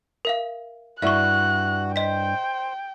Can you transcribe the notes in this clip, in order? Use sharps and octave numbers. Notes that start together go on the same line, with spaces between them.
A#4 E5 F5
G2 E4 F#4 E5 C#6 F#6
C5 D#5 G5 B6